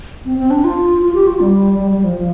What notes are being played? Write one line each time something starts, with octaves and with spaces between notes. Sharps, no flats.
C4
C4
D4
F4
F4
G4
F4
G3
G3
G3
F3
F3